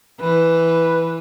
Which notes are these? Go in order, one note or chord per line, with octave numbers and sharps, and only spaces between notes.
E3 B4